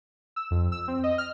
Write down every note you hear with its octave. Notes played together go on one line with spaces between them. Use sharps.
E6
F2
E6
C4
D#5
F6